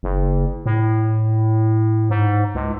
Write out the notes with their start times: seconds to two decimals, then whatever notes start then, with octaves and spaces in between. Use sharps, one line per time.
0.03 F#1
0.66 A2
2.10 G#2
2.55 C#2